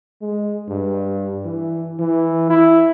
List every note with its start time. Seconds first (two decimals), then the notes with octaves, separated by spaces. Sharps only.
0.21 G#3
0.68 G2
1.45 E3
1.99 E3
2.50 E4